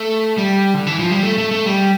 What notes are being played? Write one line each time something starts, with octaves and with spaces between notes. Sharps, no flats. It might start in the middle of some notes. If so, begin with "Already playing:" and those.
Already playing: A3
G3
D3
E3
F3
G3
A3
A3
A3
G3